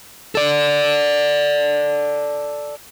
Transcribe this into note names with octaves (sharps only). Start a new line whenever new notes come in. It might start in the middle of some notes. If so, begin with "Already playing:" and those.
A4 D5